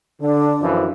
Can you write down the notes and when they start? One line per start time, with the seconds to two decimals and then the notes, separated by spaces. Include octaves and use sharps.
0.21 D3 D4
0.61 F#2 E3 F3